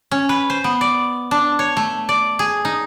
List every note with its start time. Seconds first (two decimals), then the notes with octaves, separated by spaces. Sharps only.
0.11 C#4
0.29 B4
0.50 C5
0.64 B3
0.81 D5
1.31 D4
1.59 C#5
1.77 A3
2.09 D5
2.39 G#4
2.65 D#4